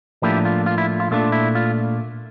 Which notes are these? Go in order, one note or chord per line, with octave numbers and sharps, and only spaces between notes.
A2 F3 A#3 D4 E4 G4
F4
F4
E4
F4
A#2 A3 D4 F4
E4
F4